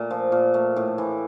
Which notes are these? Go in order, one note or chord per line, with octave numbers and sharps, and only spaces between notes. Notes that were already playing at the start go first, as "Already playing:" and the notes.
Already playing: A#2 A3 A#4
F3
A#2
A3
A2
E3